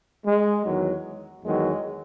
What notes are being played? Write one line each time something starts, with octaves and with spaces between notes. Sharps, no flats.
G#3
E2 D#3 F#3
E2 D#3 F#3 G#3